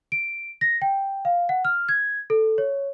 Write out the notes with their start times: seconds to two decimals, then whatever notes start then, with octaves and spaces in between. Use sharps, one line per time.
0.12 D7
0.61 A#6
0.82 G5
1.25 F5
1.49 F#5
1.65 F6
1.89 G#6
2.30 A4
2.58 C#5